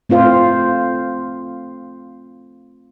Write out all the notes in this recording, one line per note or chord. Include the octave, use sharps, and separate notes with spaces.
A3 C4 F4 C5 F5